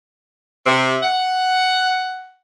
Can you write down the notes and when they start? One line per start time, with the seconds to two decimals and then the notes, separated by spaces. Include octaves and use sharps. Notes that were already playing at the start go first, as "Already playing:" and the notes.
0.66 C3
1.03 F#5